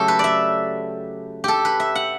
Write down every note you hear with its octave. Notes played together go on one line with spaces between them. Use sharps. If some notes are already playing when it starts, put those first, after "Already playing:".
Already playing: C#3 F#3 A3 G4 A4
B4
D5 E5
G4 A4
B4
E5
F#5